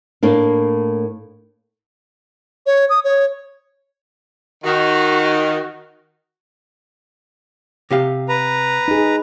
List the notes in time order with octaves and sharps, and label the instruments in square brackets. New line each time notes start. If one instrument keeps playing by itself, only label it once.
[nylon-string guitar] A2 A#3 D4
[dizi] C#5
D#6
C#5
[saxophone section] D#3 [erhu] F#4
[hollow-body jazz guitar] C3 G4 F5
[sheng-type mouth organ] B4 A#5
[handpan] D#4 G#4